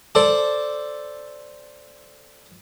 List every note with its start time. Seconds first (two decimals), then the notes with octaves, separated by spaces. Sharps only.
0.15 A4 C5 D5 A5